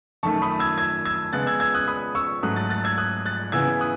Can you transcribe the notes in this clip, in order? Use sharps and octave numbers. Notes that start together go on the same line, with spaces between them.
F#2 D#3 A3 A5 C#6
B5 D#6
E6 G#6
E6 G#6
E6 G#6
C#3 G#3 B3 F#6 A6
E6 G#6
E6 G#6
D#6 F#6
B5 D#6
C#6 E6
G#2 F#3 A3 D#6 F#6
F#6 A6
F#6 A6
E6 G#6
D#6 F#6
F#6 A6
C#3 E3 B3 E6 G#6
D#6 F#6